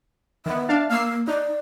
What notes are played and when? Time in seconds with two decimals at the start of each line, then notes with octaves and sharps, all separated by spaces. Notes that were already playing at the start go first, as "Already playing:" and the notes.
0.46 D#3 B3 E5
0.69 D4 F5 A5
0.89 A#3 F5 E6 C7
1.28 D#4 D5